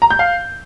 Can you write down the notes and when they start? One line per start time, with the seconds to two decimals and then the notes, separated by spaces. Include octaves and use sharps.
0.02 A#5
0.10 G6
0.19 F5